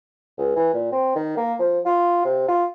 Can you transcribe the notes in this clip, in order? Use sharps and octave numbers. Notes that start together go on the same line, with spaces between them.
C#2
E3
A#2
C4
D#3
A#3
F3
F4
C3
F4